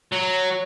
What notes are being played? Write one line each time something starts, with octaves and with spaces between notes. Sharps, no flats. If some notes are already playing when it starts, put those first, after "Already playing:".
F#3